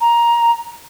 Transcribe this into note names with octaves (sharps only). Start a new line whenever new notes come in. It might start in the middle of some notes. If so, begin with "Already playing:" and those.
A#5